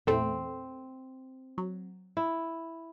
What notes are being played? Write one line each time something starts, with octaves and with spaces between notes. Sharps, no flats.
A#1 E2 A3 C4
F#3
E4